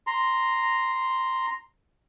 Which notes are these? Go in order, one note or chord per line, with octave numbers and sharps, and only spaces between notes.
A#5 C6